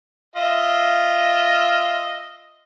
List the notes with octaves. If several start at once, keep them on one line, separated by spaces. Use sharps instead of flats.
F4 D#5 E5